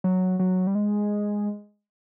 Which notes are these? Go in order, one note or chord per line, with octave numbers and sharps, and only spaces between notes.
F#3
F#3
G3
G#3